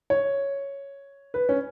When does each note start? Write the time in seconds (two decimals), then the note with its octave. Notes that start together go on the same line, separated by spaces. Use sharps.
0.10 C#5
1.34 B4
1.49 C#4